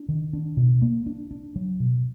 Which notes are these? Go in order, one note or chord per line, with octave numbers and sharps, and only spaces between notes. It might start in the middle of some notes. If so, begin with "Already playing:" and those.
Already playing: D4
D#3
D4
B2
A#3
D4
D4
F#3
B2